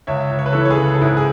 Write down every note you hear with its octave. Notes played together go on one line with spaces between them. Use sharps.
C#2 C#5 E5
C#2
C#5
B4
E3 A4 C#5
C#5
G#4 B4
C#3
A4
G#2 E4 G#4
G#4